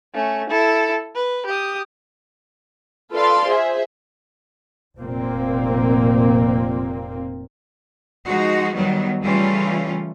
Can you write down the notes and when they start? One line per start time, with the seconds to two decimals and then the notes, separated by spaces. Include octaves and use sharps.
0.14 A3 C#4
0.49 E4 A4
1.15 B4
1.46 G4 D#6
3.12 F4 A4 B4 D5 F5 C6
3.48 G#4 C5 E5
4.99 F1 A#2 A#3 C4
8.26 F3 G#3 D#4 F#4
8.73 D#3 F#3 G3 B3
9.21 C#3 E3 G3 A3 C#4 F4